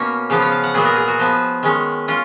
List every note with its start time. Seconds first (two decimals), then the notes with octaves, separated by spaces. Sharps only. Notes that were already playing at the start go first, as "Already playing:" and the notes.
Already playing: B2 A#3 C#4 C#5
0.30 C#3 F3 B3 F5
0.42 C#5
0.52 F5
0.64 F#5
0.74 A#2 F#3 B3 G#4
0.85 A#4
0.97 G#4
1.08 F#4
1.19 F3 B3
1.63 D#3 G#3 C#4
2.08 C#4 F4